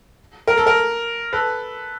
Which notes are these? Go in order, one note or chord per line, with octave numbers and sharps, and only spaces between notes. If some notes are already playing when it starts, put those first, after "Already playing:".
A#4
A4
A#4
A4 B4